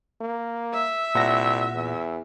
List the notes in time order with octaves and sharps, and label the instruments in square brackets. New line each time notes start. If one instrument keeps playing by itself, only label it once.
[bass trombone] A#3
[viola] E5
[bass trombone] C2 [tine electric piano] A#2 F#5 A#6
[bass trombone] E2